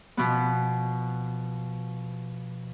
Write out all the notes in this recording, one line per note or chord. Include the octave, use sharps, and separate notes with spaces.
B2 F3 B3